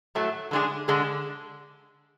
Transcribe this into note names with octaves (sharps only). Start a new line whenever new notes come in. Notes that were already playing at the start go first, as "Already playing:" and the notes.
A2 F#3 A3
D3 G#3 D4 G#4
D3 G#3 D4 G#4